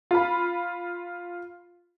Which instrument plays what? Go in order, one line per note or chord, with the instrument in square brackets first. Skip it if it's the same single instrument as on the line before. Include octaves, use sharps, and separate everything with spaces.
[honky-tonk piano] F4 B5